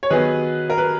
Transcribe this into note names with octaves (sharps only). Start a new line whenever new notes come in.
C#5
D#3 F#3 B3 G#4 B4
A#4
B4